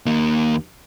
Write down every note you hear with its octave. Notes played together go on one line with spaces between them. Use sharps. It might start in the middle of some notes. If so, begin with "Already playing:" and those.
D#2 A#3